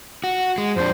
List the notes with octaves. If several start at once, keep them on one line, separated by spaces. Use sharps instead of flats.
F#4
G#3
F2 D4 C5